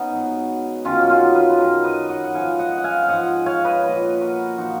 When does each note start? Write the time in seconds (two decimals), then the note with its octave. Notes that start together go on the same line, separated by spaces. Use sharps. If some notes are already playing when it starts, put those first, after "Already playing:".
Already playing: B3 C#4 D#4
0.11 G#2 F#3
0.84 F#2 D#3 F#3 C#4 F4
1.00 F#4
1.10 F4 G#4
1.35 G#4 B4
1.49 B4
1.59 F#2 D#3 F#3 A#4 C#5
1.84 B4 D#5
2.09 D#5 F#5
2.24 F#5
2.34 G#2 F3 F5 G#5
2.59 D#5 F#5
2.78 F#5
2.84 F5 G#5
3.03 F5
3.08 G#2 F3 D#5 F#5
3.46 C#5 F5
3.65 B4 D#5
3.84 A#2 F3 B4 D#5
4.21 F#4 A#4
4.58 A#2 F3 D#4 F#4